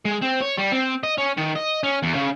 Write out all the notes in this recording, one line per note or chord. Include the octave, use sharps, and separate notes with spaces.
G#3
C4
C#5
G3
C4
D#5
C#4
D#3
D#5
C#4
E2
C#3